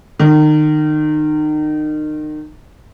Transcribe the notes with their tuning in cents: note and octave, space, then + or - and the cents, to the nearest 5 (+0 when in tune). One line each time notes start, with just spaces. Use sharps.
D#3 -30